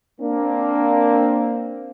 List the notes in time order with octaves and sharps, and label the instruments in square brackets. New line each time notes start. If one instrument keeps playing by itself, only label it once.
[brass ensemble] A#3 C4 D4